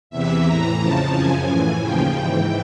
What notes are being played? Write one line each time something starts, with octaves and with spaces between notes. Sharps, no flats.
E2 C3 E3 E5
A2 E3 A#5
F2 C#3 F3 A5
F#2 C#3 F3 G#5
A2 E3
D#2 C#3 F3 G5
G#2 E3 G5